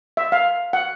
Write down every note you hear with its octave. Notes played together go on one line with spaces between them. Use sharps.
E5
F5
F#5